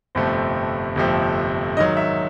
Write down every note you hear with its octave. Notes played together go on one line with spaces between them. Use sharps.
G1 F2 C3 F3 A3 C5
G1 F2 C3 F3 A3
G#2 D#3 F#3 D#5
E5